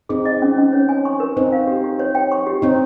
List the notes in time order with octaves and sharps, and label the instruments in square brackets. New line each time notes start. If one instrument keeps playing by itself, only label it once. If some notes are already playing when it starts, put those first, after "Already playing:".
[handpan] C4 D#4 [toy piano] G#4
[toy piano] D#5
C#4
C#4
C#5
G#5
C#6
A#4
[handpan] C4 D#4 [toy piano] C5
[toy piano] F5
G4
G4
C#5
G5
C#6
G4
[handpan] C4 D#4 [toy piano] C#5